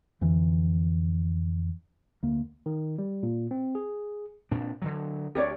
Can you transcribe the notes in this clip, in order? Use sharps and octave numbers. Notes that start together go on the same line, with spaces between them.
F2 D3 E3
D2 A#3
D#3
G3
A#2
C4
G#4
A#2 C4 D4
D3 D#3 F#3
D2 G4 C#5 D5